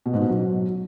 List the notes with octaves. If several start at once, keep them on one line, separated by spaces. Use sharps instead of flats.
B2
G#2
B2
F#3